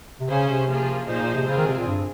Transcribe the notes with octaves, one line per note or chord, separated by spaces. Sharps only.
C3
C#3 C#4 G#4 C5
C3
F3 A#3 F4 G#4
A#2 F3 A#3 D#4 G#4 C5
A#2
C3
C#3 G#3 C4 F4 G#4
D#3
C3
A#2
G2